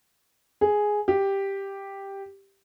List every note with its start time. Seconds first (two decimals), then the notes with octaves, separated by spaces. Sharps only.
0.61 G#4
1.08 G4